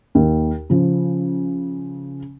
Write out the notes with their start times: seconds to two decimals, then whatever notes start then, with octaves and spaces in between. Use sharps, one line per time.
0.15 D#2
0.70 C#3 F3